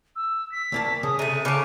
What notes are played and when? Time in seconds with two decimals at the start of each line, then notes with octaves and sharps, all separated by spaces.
0.16 E6
0.52 B6
0.72 D2 A#3 A5
1.03 C#3 D#6
1.19 C3 A3 D#7
1.45 C#3 C#5 A5 D6